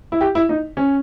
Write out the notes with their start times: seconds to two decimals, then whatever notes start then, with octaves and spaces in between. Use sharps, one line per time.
0.12 E4
0.21 G4
0.35 E4
0.49 D#4
0.77 C#4